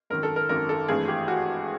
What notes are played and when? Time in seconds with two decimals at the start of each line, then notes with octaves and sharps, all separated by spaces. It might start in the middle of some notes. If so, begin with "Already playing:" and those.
0.10 G#1 F#2 D#3 A#4
0.23 A4
0.36 A#4
0.49 G#1 F#2 D#3 A#4
0.69 A4
0.88 G#1 G2 E3 A3 G#4
1.08 G4
1.28 F#4